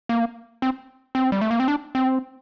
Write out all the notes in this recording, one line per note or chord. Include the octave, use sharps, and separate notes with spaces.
A#3
C4
C4
G3
A3
A#3
C4
D4
C4